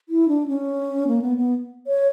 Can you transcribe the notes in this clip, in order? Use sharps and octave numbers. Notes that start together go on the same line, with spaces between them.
E4
D4
C#4
A#3
B3
B3
C#5